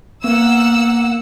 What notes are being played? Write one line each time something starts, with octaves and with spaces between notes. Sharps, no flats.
A#3 B3 F#5 E6